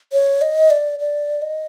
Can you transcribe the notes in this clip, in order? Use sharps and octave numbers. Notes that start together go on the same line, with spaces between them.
C#5
D#5
D5
D5
D#5